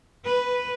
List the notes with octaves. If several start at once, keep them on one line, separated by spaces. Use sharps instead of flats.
B4